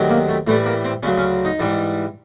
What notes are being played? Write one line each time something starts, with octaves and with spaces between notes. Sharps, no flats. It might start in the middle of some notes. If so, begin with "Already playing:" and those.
Already playing: D2 C3 D#3 F#3
A#3
A3
A2 E3 G3 A3
A#3
C4
D2 C#3 F#3 C#4
C#4
D#4
G#2 E3 G3